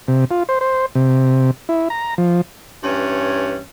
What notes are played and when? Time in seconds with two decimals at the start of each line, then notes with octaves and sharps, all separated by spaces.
0.08 C3
0.31 F4
0.49 C5
0.61 C5
0.95 C3
1.69 E4
1.90 A#5
2.18 F3
2.83 G2 E3 C#4 C#5